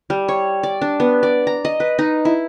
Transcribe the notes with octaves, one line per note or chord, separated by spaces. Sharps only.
G3
C#5
D5
D4
B3
D5
A#5
D#5
B4
D#4
E4